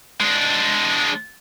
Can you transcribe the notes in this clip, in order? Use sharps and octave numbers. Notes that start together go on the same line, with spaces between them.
G#3 D4